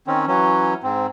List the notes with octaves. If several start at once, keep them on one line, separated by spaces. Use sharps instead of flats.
D#3 C4 C#4
E3 F#3 C#4
G#2 C4